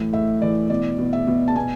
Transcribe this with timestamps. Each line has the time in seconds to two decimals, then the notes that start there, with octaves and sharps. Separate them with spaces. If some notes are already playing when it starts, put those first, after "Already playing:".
Already playing: A2 E3
0.13 A2 E5
0.42 E3 D5
0.70 B2 D5
0.98 B2
1.13 E5
1.27 B2
1.48 A5
1.56 B2 G#5